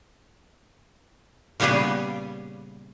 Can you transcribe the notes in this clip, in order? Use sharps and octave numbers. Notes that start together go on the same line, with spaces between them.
A#2 C#3 G3 B3 G4 G#4